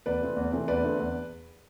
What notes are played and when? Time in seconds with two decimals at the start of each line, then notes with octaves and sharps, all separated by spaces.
0.06 E2 B4 D5
0.21 C3 E3 A3 C4
0.37 E2
0.52 C3 E3 A3 C4
0.68 E2 B4 D5
0.83 D3 A3 C4
1.00 E2